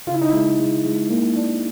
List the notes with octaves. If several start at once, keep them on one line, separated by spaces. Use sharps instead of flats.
C#3 F4
E4
D#4
G#3 E4
G#3
G#3
A#3
D4